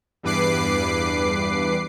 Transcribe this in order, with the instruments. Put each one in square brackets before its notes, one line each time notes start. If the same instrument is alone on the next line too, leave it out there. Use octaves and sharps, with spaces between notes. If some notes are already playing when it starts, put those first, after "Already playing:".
[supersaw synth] E2 G2 B4 D6 C7